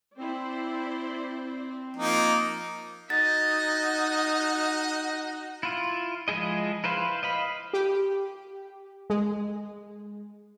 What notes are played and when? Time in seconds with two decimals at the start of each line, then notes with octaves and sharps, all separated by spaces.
0.18 C4 E4 C5 D5
1.97 F3 A#3 D#4
3.10 D#4 F#4 D#5 A6
5.63 E4 F4
6.28 F3 G#3 E4 G#4 D#5
6.84 E4 B4 C5 F5
7.23 D#5 F5 B5
7.73 G4
9.10 G#3